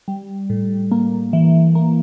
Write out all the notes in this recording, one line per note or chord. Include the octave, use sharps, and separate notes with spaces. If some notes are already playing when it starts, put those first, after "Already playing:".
G3
A2
A#3
E3
A#3